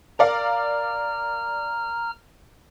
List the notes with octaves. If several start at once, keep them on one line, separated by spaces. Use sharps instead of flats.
A#4 D5 F5 A#5 F6